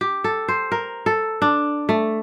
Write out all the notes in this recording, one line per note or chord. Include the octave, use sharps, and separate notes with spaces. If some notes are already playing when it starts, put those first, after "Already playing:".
G4
A4
C5
A#4
A4
D4
A3